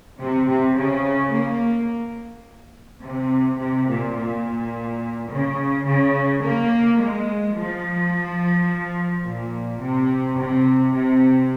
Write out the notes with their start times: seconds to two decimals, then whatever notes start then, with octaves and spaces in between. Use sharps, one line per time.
0.20 C3
0.48 C3
0.77 C#3
1.33 A#3
3.03 C3
3.59 C3
3.87 A#2
4.16 A#2
5.29 C#3
5.85 C#3
6.41 A#3
6.99 G#3
7.55 F3
9.24 A#2
9.80 C3
10.38 C3
10.93 C3